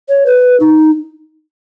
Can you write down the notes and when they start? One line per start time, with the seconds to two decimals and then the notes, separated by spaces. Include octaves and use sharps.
0.09 C#5
0.26 B4
0.60 D#4